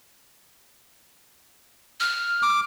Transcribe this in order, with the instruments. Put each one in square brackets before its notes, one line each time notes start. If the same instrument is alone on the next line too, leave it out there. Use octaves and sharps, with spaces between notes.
[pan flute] F6
[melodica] D6